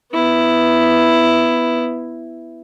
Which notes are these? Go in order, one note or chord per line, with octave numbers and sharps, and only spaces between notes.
B3 E4